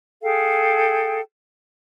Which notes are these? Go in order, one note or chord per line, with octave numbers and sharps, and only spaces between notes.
G#4 A4 F5 G5